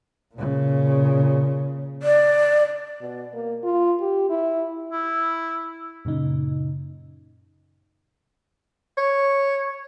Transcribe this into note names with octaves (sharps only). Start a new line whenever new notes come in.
A#2 C#3
D5
B2
A#3
F4
G4
E4
E4
F#2 A#2 C#3 D#4
C#5